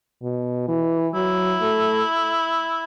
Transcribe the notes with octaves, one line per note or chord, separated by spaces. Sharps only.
B2
E3
F#3 E4
A3